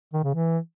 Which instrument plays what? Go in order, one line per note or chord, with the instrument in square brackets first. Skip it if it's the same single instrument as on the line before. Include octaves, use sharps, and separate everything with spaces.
[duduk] D#3
C#3
E3